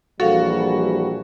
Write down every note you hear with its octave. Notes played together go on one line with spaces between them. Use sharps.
A#1 E3 G3 F#4 A4 F5